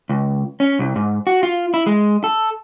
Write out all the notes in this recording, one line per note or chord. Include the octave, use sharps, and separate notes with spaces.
C#2
C#4
C2
G#2
F#4
F4
E4
G#3
A4